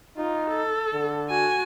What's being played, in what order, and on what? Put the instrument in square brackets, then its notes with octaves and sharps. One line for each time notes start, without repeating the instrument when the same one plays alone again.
[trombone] D#4 [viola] F4
[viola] A4
[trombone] D3
[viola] F#4 G#5